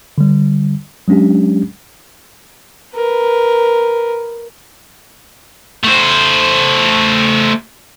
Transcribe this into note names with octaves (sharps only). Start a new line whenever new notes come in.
D3 G3
F#3 G#3 C#4 D4 G4
A#4 B4
A3 C5